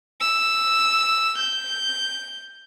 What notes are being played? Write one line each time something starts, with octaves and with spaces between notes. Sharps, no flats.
E6
G6